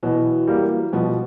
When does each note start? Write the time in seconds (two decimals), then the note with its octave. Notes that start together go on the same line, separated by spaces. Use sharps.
0.03 B2 E3 F#3
0.47 G3 A#3
0.92 B2 F3 G3